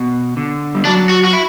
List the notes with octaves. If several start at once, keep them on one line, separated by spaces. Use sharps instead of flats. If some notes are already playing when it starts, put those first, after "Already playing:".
Already playing: B2
D3
G3
F#3 D4
F#4
F#4
E4